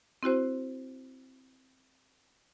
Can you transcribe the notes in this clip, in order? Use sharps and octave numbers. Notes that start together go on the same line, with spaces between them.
C4 E4 F#4 C5